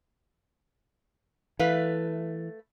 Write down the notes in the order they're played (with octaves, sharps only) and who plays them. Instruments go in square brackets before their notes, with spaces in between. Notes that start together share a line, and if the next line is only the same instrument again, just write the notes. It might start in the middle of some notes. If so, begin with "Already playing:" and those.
[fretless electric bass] E3 [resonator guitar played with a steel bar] A3 B4 F5